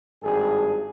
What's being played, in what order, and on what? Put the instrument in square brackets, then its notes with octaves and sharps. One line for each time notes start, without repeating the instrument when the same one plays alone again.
[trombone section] G#1 G2 G#4